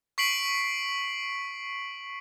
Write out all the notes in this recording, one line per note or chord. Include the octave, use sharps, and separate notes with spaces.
C#6 B6 C7 D7 F#7